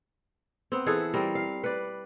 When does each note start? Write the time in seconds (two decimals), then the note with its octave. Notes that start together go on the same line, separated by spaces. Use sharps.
0.72 B3 C4
0.86 E3 G#4 A4 B4
1.14 G3 C4 A#4
1.35 F5
1.64 B4 D5